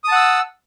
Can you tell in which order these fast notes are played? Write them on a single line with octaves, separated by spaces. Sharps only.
D#6 A5 F#5 E6